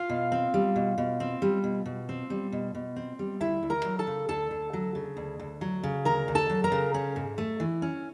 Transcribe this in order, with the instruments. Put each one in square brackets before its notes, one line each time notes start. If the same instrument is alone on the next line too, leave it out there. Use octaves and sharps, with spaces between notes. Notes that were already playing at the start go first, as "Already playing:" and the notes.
Already playing: [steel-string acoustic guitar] F4 F5
B2
C4
G3
B2
B2
C4
G3
B2
B2
C4
G3
B2
B2
C4
G3
D2 E4 E5
D2
A#4 A#5
F#3
A4 A5
C#3
D2 A4 A5
D2
F#3
C#3
D2
D2
F#3
C#3
D2 A#4 A#5
D2
A4 A5
F#3
A#4 A#5
C#3
C#4
G#2
A3
E3
C#4